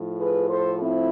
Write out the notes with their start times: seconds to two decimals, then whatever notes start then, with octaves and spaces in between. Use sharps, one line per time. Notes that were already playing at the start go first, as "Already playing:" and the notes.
Already playing: A2 F3
0.19 G#4 B4
0.49 A4 C5
0.80 C4 E4